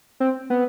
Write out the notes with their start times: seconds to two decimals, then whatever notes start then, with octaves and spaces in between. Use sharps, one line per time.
0.20 C4
0.50 B3